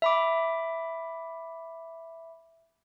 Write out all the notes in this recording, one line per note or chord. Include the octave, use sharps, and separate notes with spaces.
E5 B5 D6